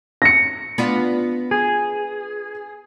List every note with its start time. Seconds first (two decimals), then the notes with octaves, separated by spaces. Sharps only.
0.22 A#6 C#7
0.78 B3 D4 F4
1.51 G#4